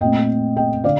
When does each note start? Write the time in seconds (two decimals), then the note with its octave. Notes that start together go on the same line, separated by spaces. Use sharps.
0.01 A#2 A3 C4 D#5 G5
0.57 D#5 G5
0.84 D3 D5 F5